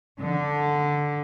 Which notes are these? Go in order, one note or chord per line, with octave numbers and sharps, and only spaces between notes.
D3